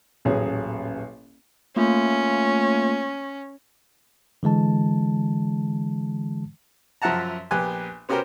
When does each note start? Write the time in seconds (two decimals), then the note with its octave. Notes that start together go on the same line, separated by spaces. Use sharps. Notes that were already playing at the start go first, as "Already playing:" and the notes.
0.25 D#1 A1 F#3 C#4 G#4
1.76 A3 A#3 C#4 F4
4.43 D3 E3 G#3 A5
7.02 F#2 F3 E5 F#5 A5 A#5
7.51 A#1 B3 G4 G#5 F#6
8.09 B3 C#4 F#4 G4 A#4 C5